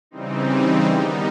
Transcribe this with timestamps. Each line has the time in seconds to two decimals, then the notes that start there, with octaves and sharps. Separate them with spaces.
0.11 C#3 E3 G3 C4 D#4
0.94 D#3 G3 B3 D#4